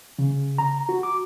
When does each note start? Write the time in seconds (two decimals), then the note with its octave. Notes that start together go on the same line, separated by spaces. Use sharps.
0.19 C#3
0.58 A#5
0.89 F#4
1.03 D6